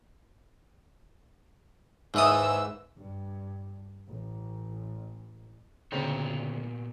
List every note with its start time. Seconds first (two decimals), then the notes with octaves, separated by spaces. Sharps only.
2.14 D#2 G#2 E3 D#6 E6
2.95 G2
4.10 A1
5.92 D2 A#2 C#3 B3 C4 A#5